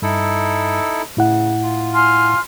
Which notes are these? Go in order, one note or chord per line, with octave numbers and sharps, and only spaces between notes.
G2 D#4 E4 A4
A2 C#3 E4 F#5
F4
G#5 C6 F6